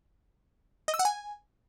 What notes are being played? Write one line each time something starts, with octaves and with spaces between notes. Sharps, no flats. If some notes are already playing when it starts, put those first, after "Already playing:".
D#5
E6
F#5
G#5